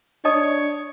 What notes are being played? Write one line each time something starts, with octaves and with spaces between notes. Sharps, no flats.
D4 C#5 D#5 A5 D#6